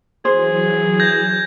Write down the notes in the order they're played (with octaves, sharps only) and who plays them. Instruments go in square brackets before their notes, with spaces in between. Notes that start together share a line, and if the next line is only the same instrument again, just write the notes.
[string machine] E3 F#3 [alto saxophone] G#4 [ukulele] C5
[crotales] G6 G#6 A#6